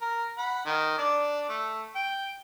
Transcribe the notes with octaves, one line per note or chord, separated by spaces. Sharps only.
A#4
F#5 B5
D#3
D4 D5
A3
G5